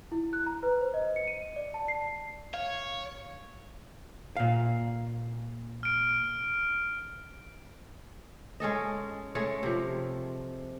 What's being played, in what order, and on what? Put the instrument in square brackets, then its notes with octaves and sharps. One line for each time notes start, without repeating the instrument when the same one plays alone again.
[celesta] E4
F#6
A#5
B4
C5
D#5
C#7
D#7
D5
A5
C7
[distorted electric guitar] C#5 [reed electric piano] F5
[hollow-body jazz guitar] A#2 F5
[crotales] F6 D7
[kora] G#3 C#4 A4 D#5
G#3 A3 A4 C#5
C3 F3